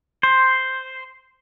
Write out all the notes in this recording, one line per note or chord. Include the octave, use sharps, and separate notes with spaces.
C5